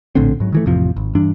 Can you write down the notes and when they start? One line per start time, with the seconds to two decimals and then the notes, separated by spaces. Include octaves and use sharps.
0.15 A#1 A2 D3 C4
0.40 G#2 F#3
0.52 D#3 E3 A3
0.66 A1 F2 C3 F3
0.97 G#1
1.15 G2 E3 D4